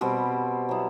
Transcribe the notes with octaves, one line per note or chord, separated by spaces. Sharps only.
B2 G3 C4
F#3 B3 E4